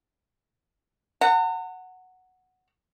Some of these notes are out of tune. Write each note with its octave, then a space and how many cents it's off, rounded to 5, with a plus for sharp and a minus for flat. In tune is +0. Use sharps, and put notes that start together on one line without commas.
F#5 +0 A#5 -45